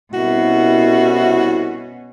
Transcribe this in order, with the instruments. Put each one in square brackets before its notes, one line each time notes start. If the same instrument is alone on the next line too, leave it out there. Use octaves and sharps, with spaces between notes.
[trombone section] C2 E4 [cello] B2 C#4 [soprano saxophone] F#4